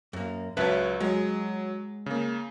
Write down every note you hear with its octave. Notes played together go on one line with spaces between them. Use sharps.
F#2 A#3
C#2 F#3 B4 C#5 E5 A5
F#3 G#3
C#3 A#3